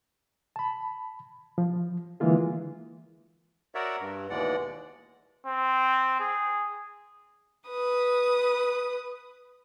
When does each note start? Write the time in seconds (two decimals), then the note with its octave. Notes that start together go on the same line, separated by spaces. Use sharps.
0.56 A5 B5
1.58 F3
2.20 D3 E3 G#3 A#3 F4 G#4
3.75 F#4 A#4 C#5 D5 E5 F#5
4.01 G2
4.30 D#2 B2 E3 G#3 D5 F#5
5.46 C4
6.20 G#4
7.68 B4 D#6